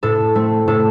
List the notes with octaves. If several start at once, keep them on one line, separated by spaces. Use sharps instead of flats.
A2 A4
A3 C4
A2 A4